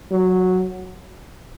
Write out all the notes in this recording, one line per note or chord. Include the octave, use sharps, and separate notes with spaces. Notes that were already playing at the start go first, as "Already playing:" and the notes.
F#3